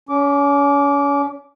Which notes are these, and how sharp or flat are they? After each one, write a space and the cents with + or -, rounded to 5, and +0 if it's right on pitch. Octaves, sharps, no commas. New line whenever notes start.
C#4 +35 D6 -15